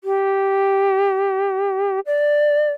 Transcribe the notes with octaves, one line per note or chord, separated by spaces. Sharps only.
G4
D5